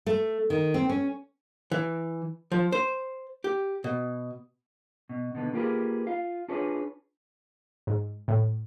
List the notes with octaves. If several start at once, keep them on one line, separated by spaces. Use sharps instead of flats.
A3
D#3
C4
C#4
E3
F3
C5
G4
B2
B2
B2 D3 B3
A#3 F4 G4 G#4 B4
F4 F5
D4 F4 G#4 B4 C#5
G#2
A2